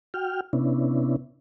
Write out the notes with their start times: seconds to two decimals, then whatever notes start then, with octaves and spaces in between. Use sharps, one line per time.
0.14 F#4 G5 F6
0.53 C3 B3 C#4 D4 E4